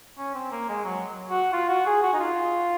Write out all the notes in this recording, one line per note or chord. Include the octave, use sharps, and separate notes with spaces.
C#4
C4
A#3
G#3
F#3
F#4
F4
F#4
G#4
F#4
D#4
F4